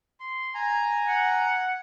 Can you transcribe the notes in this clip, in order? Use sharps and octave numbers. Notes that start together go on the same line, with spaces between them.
C6
G#5 A#5
F#5